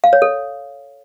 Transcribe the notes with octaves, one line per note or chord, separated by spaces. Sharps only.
F5
C#5
A4